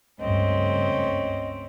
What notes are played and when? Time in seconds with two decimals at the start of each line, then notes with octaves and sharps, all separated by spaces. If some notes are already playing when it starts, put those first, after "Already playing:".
0.20 C#2 G2 A3 C4 C#4 D#5